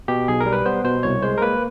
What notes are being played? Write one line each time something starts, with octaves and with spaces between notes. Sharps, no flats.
B2 G4
B1 G#4
A#4
G3
B4
B3 C5
B2 C5
C2 C#5
G#3 C5
A#4
A#3 B4